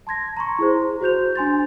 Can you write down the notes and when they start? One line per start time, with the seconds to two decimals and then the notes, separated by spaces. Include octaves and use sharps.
0.07 A5 C6 G#6 A#6
0.37 A#5 C6 C#6
0.59 E4 G#4 C5
1.01 F#4 C5 G6 F7
1.36 D4 G#5 C6 A6